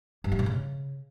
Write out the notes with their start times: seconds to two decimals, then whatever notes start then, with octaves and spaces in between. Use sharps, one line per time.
0.24 G2
0.32 G3
0.39 B2
0.46 C#3